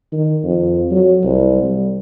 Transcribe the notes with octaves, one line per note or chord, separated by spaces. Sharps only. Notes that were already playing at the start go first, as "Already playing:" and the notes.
D#3
F2
F#3
C2
G3